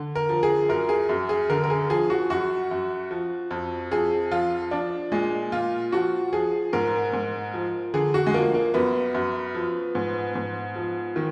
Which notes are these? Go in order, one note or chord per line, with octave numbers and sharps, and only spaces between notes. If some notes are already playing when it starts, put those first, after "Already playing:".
Already playing: D3
A#4
F3
G#4
F#2 A#4
G#4
F#2
G#4
D3 A#4
A#4
G#4
F3 G#4
F#4
F#2 F#4
F#2
F3
F2
F2 G#4
F3 F4
F3 D4
A#2 G#3
A#2 F4
F3 F#4
F3 G#4
G#2 A#4
G#2
F3
D3 G#4
F#4
G#3
F3 A#3
A#3
F#2 B3
F#2
F3
G#2
G#2
F3
D#3